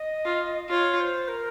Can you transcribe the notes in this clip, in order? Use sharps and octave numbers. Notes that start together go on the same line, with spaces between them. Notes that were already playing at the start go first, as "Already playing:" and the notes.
Already playing: D#5
F4
F4 C#5
C5
A#4